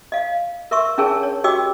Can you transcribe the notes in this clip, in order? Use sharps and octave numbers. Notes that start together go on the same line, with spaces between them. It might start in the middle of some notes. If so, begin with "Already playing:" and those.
D#5 F5
A#4 E5 C6 C#6 E6
C#4 D4 G#4 A#4 C#5 A5
C#5
F#4 G4 D#5 G5 D6 E6